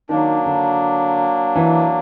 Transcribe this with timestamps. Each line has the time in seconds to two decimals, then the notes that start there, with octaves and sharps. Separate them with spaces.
0.09 D#3 F#3 A#3 D4
0.46 D3
1.56 E3